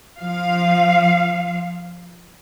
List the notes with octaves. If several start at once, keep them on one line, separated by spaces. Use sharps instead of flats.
F3 F5